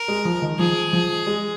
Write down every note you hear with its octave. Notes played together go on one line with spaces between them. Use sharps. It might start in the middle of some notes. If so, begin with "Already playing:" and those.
Already playing: A#4
G#3
F3
D#3
F3 G#4
F3
G#3